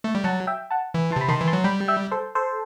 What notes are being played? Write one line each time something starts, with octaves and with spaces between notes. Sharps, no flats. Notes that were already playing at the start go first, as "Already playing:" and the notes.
A3
G3
F#3 F#5 A5
E5 G5
F#5 A5
E3
A5 C6
C3 B5
D#3 A5 C6
E3
A5 C6
F#3
G3 G5 B5
E5 G5
A4 C5
A4 C5